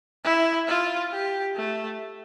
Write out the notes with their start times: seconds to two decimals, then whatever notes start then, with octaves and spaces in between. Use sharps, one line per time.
0.24 E4
0.68 F4
1.12 G4
1.56 A3